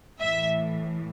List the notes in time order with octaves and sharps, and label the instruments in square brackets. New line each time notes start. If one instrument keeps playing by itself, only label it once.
[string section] A2 E3 E5